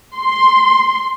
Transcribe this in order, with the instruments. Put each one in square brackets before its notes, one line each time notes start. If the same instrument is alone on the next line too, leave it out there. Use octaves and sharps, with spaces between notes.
[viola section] C6